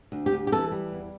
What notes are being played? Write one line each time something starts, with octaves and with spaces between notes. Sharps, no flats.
D2
G4
D2
G4
E3 A4
G3
E2